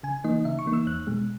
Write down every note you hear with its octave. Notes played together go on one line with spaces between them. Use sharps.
C#3 G#5
E3 A#3 D#4 D#5
C#3 E5
C#6
E3 A#3 D#4
E6
E2 F#6
B2 G#3